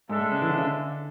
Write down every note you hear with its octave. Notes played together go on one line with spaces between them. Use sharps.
G#2 G#3 D4 A4 E5
A2
C#3
E3
D3
C#3
D3